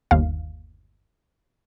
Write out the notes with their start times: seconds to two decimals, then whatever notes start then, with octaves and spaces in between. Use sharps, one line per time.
0.11 G1 D#2 F5